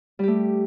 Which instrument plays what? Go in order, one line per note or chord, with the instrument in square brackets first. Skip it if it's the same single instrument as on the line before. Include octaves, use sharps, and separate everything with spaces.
[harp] G3
G4
A3